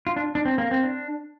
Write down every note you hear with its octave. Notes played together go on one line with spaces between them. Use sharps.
F4
D4
D4
C4
A#3
C4
D4